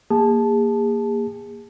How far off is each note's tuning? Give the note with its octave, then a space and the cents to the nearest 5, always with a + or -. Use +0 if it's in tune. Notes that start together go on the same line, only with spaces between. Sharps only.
A#3 +0 G#4 -35 A5 -10